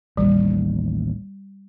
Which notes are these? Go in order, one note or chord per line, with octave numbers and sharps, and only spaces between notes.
A1 D#2 G3